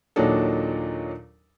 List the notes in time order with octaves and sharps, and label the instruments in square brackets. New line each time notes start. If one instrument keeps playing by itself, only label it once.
[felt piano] D#2 A#2 F#3 D4 D#4 A4